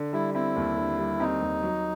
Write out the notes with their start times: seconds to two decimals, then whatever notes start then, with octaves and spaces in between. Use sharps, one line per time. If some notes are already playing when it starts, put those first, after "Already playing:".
Already playing: D3
0.13 G3 E4
0.34 C4 E4
0.56 D#2
0.77 D3
0.99 G3
1.20 C4 D#4
1.41 D#2
1.63 F#3